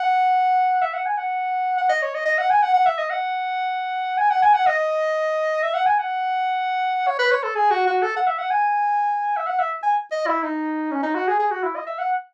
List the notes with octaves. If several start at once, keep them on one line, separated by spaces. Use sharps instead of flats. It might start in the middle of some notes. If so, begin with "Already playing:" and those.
Already playing: F#5
E5
F#5
G#5
F#5
F#5
D#5
C#5
D#5
D#5
F#5
G#5
F#5
F#5
E5
D#5
F#5
G#5
F#5
G#5
F#5
D#5
E5
F#5
G#5
F#5
C#5
B4
C#5
A4
G#4
F#4
F#4
A4
F#5
E5
F#5
G#5
E5
F#5
E5
G#5
D#5
E4
D#4
C#4
D#4
F#4
G#4
G#4
F#4
E4
D#5
E5
F#5